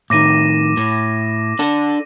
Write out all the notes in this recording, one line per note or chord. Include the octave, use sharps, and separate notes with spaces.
A2 D#3 D6 A#6 D#7
A2
D4 A4